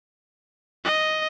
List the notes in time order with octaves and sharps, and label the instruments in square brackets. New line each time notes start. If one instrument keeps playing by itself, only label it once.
[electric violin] D#5